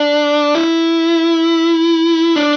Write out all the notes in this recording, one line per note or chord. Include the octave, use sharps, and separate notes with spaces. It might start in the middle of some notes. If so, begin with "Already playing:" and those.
Already playing: D4
E4
D4